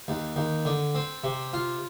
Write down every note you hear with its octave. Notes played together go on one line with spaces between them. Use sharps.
D#2
D#2
D3
C4
C3
F4